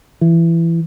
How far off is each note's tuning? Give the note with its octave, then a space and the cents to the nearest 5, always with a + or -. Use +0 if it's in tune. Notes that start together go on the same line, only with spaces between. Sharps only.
E3 +20